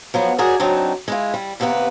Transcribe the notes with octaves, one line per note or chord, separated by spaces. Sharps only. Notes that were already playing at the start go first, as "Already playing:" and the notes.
F3 F#3 B3
F#4 G#4 A#4 C#5 D5
F#3 C4 D4 D#4
G#3 E4 F4
G3
D#2 C3 A#3 B3 B4